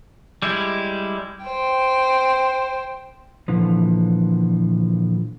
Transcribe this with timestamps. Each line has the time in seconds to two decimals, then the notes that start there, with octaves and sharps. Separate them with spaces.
0.42 G3 G#3 E4
1.43 C5 G5
3.48 A#2 D3 E3 F3